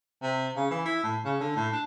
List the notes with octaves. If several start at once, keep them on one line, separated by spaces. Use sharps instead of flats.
C3
C#3
E3
E4
A2
C#3
D3
A2
D4